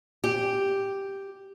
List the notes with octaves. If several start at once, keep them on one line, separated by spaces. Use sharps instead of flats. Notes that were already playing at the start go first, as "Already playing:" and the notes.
G4